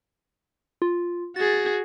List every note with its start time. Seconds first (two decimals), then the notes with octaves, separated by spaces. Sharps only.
0.82 F4
1.36 F#4 G#4 A6